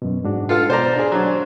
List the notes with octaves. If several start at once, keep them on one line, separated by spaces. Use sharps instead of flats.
F#2 B2
G#2 D4 F#4
F4 A4 F5
B2 C5 D5 A#5
D4 G#4
F#3 D4 C5 A#5